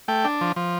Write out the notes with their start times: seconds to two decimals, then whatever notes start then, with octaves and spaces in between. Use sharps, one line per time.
0.08 A3 G5
0.25 D4
0.41 F3
0.56 F3